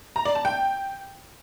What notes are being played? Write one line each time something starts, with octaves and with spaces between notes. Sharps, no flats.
A#5
D5
A5
G5